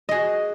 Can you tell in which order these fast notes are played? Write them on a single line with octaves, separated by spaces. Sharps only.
D#5 G#4 F#4